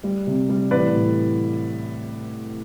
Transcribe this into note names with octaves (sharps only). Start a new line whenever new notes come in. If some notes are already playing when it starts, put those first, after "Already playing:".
G3
C3
G3
A1 B4 D5
A2